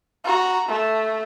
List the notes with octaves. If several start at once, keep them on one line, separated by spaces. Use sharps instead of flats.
F#4 A#5
A3